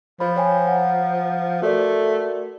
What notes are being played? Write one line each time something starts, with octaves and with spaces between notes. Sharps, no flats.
F3 C5 B5
C#5 G5 G#5
F#5 A#5
A3 F#4 A#4 D5